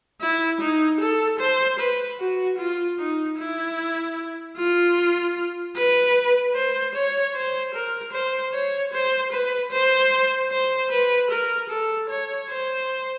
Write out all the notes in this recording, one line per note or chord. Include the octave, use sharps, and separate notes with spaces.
E4
D#4
A4
C5
B4
F#4
F4
D#4
E4
F4
B4
C5
C#5
C5
A#4
C5
C#5
C5
B4
C5
C5
B4
A#4
A4
C#5
C5